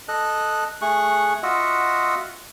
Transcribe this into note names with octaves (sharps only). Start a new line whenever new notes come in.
A4 D#5 F#6
A3 G#4 C#6 F#6
F4 F#4 D#5 E5 F#5